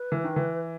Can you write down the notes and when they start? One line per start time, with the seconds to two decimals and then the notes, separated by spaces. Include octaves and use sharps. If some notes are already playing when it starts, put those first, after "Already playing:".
Already playing: B4
0.12 E3
0.24 D#3
0.36 E3